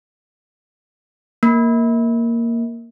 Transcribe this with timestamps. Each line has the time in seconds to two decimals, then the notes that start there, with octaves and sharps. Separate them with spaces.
1.43 A#3